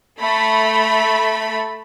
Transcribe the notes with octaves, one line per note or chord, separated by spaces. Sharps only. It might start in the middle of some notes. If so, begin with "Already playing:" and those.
A3 B5